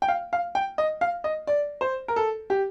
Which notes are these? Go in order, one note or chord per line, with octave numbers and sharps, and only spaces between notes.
G5
F5
F5
G5
D#5
F5
D#5
D5
C5
A#4
A4
G4